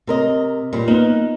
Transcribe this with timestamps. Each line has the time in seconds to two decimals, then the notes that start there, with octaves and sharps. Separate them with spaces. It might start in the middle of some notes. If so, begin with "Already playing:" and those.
0.07 C3 A#4 D#5
0.73 A#2 G3
0.88 A#3 B3 D#4